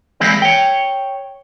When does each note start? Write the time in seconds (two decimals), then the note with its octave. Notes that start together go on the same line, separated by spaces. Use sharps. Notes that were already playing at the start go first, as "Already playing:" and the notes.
0.20 E3 G3 G#3 A#3 C4 E4
0.42 C#5 G5